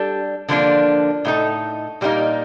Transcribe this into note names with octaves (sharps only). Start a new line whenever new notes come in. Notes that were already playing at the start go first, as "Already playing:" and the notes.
Already playing: G3 D4 A4
D3 F3 A#3 D4
A2 A3 D#4 A4
A#2 G3 A#3 D#4